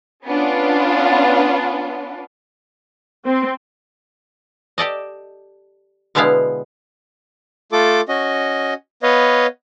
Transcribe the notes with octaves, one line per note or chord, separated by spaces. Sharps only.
B3 C#4 D4 F4
C4
G4 A4 D5 D#5
B2 D3 G#3 B3 E4 F5
A3 F4 A4 D6
C#4 F#4 D#5
B3 B4 C#5 D#5 F5